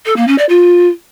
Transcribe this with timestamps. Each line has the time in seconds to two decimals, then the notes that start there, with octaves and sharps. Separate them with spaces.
0.06 A4
0.16 A#3
0.27 C#4
0.38 D5
0.49 F4